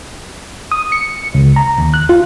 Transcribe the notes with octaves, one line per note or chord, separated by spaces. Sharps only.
D#6
C#7
C#2
A#5
D#2
F#6
F4